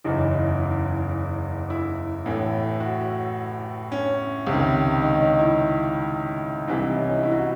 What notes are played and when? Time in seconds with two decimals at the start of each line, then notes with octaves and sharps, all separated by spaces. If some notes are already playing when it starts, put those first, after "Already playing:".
0.04 F#1 E2 C#3 E3 D#4
0.60 E4
1.70 E4
2.26 A1 A2 E3
2.80 F#4
3.92 C#4
4.47 C#2 C3 D#3
5.02 D#4
5.20 D#4
5.39 E4
6.68 C2 C3 E3 E4
6.81 D#4
6.96 C#4
7.09 D#4
7.23 E4
7.32 F#4